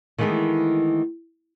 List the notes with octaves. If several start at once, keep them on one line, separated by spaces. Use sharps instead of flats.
D#3 E3 G#3 A3 B3 E4